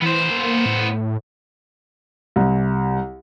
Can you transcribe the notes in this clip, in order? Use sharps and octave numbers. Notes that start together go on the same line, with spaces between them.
E3 B3 C5
A#3
A2
C2